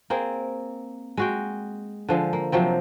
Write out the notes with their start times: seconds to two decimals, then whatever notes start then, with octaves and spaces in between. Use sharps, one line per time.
0.10 A#3 C4 G#4
1.17 G#3 F#4 G5
2.09 D3 F3 G#3
2.33 A#3
2.52 C3 F3 F#3 C4